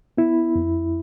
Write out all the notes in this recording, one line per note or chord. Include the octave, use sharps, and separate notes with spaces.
B3 E4
F2